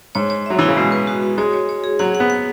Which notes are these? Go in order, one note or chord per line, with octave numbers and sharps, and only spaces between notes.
G#2 C#5
C#5
F#3 E5
E3 E4
C#3
B2 G#3
B4
F#4
F#4
G#3 C#5
C#5
C#5
G#4
F#3 F#5
F#5
B3
F#5